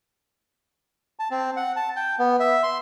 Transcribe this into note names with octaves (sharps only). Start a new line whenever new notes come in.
A5
C4
F#5
A5
G5
B3
E5
C6